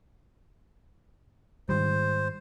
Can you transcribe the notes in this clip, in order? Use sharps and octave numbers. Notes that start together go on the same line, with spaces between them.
G#2 D#3 G3 C5